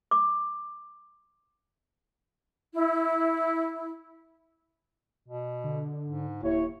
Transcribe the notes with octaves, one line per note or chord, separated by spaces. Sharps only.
D6
E4
B2
D3
G#2
D#1 D#2 E4 C#5